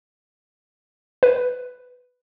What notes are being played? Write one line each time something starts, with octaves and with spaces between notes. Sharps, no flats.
B4